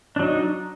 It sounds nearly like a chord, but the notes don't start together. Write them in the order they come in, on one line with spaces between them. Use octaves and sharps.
D4 F#3 D#4